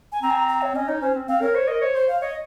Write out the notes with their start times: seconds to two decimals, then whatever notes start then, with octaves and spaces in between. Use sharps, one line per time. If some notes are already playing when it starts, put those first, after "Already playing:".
0.12 G#5
0.22 C4 A#5
0.31 G#5
0.36 A#5
0.49 A#5
0.62 C#5
0.75 C#4 D#5
0.88 D#4 C#5
1.02 C#4 C5
1.15 C4
1.28 C4 F5
1.41 A#4 C#5
1.55 C5 C#5
1.68 A#4 D#5
1.81 C5 C#5
1.95 C5 C#5
2.08 F5
2.21 C#5 D#5